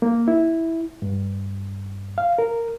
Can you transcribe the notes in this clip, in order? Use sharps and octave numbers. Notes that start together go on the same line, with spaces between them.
A#3
E4
G2
F5
A#4